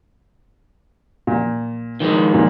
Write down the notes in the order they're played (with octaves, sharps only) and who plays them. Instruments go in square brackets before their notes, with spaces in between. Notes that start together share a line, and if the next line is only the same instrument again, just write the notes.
[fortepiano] A#2
[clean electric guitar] D#3 F3 G#3
[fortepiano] A#2